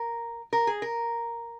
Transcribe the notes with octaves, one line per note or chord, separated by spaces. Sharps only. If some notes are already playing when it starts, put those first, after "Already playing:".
Already playing: A#4
A#4
G#4
A#4